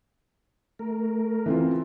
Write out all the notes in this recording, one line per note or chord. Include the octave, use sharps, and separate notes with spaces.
A3 A#4
E3 C4 F4